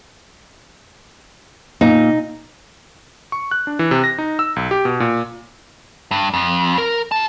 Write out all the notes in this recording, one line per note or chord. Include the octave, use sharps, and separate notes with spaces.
A#2 D#4
C#6
F#6
D4
E3
C3
A#6
D#4
E6
B1
G4
B2
A#2
G2
F2
A#4
F#4 A5